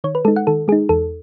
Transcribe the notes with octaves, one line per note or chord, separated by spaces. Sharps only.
D#3 C#5
B4
G#3 D#4 A4
F#5
D#3 A4
G#3 D#4 G#4
E2 A4